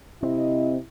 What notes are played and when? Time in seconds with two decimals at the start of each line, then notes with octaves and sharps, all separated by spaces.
0.23 C3 C4 E4 D#5